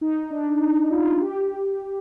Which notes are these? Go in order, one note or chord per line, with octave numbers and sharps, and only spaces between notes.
D#4
D4
D#4
F4
G4